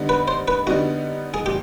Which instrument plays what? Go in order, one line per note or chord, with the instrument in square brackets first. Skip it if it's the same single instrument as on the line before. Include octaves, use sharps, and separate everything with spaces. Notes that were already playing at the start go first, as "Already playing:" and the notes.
Already playing: [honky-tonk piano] D3 G3 B3 D#4
[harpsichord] B4
C5
B4
[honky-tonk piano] D3 G3 B3 D#4 [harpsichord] F#4
[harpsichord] G#4
[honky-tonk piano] A#2 F3 [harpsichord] G4